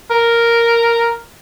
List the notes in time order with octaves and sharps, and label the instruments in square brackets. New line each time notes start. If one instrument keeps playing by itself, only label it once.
[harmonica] A#4